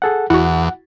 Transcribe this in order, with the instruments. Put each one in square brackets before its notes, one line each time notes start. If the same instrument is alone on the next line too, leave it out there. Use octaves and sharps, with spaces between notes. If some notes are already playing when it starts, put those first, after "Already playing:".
[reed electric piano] G#4 A4 F#5
[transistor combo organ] E2 [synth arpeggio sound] E4 F#4 [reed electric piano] F#5